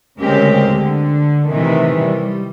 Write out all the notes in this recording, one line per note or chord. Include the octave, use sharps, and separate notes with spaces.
D2 C#3 G#3 C4 G4 A#4
D3
C3 D#3 E3 A3
G3